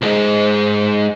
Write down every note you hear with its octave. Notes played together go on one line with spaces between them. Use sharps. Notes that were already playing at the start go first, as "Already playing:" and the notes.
C2 G#2